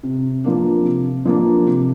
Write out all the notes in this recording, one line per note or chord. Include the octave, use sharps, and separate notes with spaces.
C3
F3 A#3 D4
C3
F3 A#3 D4
C3